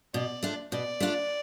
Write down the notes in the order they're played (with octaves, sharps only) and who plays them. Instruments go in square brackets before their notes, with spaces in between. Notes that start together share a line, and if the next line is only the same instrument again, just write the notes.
[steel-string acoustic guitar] B2 [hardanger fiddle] D5
[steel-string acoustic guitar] A3 D4 F4
[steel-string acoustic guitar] B2 [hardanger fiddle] D5
[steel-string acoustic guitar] A3 D4 F4